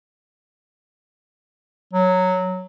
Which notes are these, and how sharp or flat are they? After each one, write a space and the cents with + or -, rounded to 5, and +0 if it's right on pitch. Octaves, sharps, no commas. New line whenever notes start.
F#3 -5